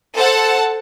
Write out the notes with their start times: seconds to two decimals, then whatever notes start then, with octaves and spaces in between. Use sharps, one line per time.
0.16 A4 C5 F#5 A5